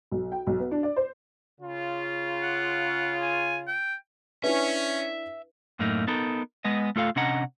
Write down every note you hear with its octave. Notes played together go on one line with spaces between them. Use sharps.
B1
G5
B1
B3
D4
D5
C5
C#3 F4
F#5
G#5
G5
C#4 D4 E4 B4 E5
F#2 A2 A3 A#3 D#4
B3 D#4 A4 A#4
G#3 B3 D#5
A3 F4 A4 F5
C3 C#4 D4 D#5 F#5 A#5